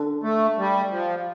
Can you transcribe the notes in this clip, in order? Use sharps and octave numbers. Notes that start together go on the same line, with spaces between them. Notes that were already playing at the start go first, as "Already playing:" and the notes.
Already playing: D3
A3
G3
F3